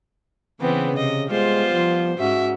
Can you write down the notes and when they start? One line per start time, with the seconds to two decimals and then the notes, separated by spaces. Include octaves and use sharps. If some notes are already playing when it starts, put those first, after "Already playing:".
0.61 C#3 E3 B3 C4
0.97 C3 D#5
1.30 G3 G#3 B3 F4 C5
1.73 F3
2.19 G#2 C#4 F#4 E5